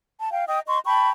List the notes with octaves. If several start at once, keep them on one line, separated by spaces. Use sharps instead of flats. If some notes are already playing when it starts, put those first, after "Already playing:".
A5
F5 G5
D#5 G5 D#6
D#5 C6 C#6
G5 A5 B5 C#6